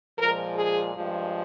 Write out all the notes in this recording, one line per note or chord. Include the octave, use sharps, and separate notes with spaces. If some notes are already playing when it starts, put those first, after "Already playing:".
A#2 F3 G#3 A#4
G#4
G2 F3 G#3